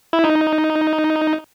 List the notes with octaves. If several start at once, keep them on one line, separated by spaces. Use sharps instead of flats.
E4
D#4